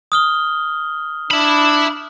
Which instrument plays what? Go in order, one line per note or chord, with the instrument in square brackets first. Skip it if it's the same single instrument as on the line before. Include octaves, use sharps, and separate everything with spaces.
[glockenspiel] D#6 F6 G7
[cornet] D4 [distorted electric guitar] E5 B5